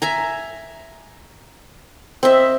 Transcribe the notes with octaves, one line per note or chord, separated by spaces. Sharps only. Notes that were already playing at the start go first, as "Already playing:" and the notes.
E5 G#5 A#5
C4 D#5 E5